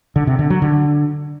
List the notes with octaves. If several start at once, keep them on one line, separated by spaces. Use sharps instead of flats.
D3
C3
D3
F#3
D3